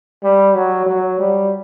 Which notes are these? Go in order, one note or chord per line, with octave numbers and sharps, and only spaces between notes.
G3
F#3
F#3
G3